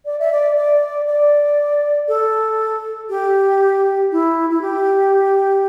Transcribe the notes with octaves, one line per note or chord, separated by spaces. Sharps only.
D5
E5
D5
D5
D5
A4
G4
E4
E4
G4